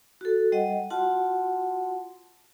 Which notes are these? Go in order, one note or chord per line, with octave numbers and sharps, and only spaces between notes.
F#4 A4
G3 D#5 F#5
F4 F#4 F#5 A5 C6